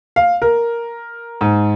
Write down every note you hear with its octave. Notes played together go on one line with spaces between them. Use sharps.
F5
A#4
G#2